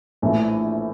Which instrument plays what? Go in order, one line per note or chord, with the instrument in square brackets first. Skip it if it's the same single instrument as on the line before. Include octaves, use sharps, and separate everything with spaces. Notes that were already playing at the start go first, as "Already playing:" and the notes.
[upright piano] A#1 A2 E3